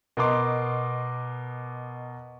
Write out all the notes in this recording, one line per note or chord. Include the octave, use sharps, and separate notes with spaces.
B2 A#4 D#5 C6 D6